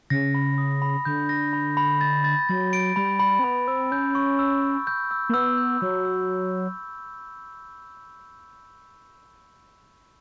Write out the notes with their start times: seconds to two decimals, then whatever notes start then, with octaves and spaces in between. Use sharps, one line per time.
0.10 C#3 A#6
0.34 B5
0.58 D#6
0.82 B5
1.05 D3 G6
1.29 A#6
1.53 B5
1.77 B5
2.01 A6
2.24 A6
2.49 F#3 A6
2.73 D7
2.96 G3 B5
3.19 B5
3.39 C4
3.44 B3 B5
3.68 C4 E6
3.91 C#4 G6
4.15 C#6
4.39 E6
4.62 C#6
4.87 G6
5.11 E6
5.29 A#3
5.34 B3 E6
5.58 G6
5.81 F#3 E6
6.05 E6